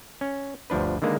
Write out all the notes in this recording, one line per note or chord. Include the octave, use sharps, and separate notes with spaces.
C#4
G1 D2 F3 D4 B4
D3 D#3 G#3 A#3 B4